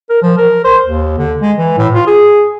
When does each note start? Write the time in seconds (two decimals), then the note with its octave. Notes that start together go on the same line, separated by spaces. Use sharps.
0.10 A#4
0.22 F3
0.38 A#4
0.64 C5
0.85 D#2
1.18 D3
1.42 G#3
1.58 E3
1.78 A2
1.94 F4
2.07 G#4